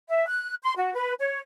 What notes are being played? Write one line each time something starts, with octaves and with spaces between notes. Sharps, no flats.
E5
F#6
C6
F#4
B4
C#5